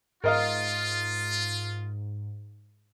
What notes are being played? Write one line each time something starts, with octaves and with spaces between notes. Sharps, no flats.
G#2 F4 A#4 D#5 F5